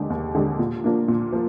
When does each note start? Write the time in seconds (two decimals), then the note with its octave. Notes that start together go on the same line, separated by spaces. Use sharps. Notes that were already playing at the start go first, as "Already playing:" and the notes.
Already playing: D#2 D3 G#3 D4 G4
0.10 D#2
0.35 D3 G#3 D4 G4
0.59 A#2
0.84 F3 A#3 D4
1.08 A#2
1.32 F3 A#3